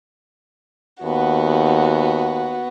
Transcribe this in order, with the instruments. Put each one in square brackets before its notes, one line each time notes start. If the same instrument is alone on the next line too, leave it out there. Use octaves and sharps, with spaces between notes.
[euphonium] D#2 [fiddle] B3 F#4